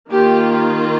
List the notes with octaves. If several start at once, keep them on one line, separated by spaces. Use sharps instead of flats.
D#3 A#3 F4 G4